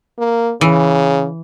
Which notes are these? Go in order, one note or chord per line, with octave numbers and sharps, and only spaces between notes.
A#3
C#3 E3